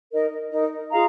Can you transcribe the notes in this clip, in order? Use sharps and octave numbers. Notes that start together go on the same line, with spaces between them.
D#4 A#4 D#5
D#4 A#4 D#5
F4 G#4 F5 A#5